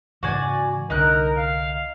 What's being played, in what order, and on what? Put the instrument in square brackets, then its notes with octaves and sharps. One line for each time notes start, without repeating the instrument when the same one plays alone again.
[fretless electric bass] G#2 C#3 E3 [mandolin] F#4 D5 G#5
[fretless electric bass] C2 D3 [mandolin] D#4 F#6 [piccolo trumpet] A#4
[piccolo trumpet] F5